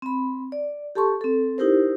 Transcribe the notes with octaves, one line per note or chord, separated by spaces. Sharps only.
C4 B5
D5
G4 A4 A5 C6 C#6
C4 A4
D#4 E4 G4 A#4 C5